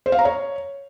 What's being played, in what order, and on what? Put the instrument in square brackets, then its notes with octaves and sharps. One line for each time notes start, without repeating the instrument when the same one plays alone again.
[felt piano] C5
F5
A#5
C#5